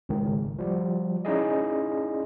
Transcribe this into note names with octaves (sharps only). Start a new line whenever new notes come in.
G#1 C#2 G#2 D#3
F3 G3
C#4 D#4 E4 G#4 D5 D#5